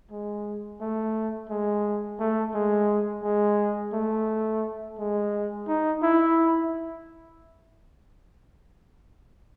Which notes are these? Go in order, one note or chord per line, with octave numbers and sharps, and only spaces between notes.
G#3
A3
G#3
A3
G#3
G#3
A3
G#3
D#4
E4